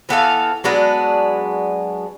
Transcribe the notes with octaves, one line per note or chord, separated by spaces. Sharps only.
E3 B3 A4 F5
F#3 G#3 B3 D4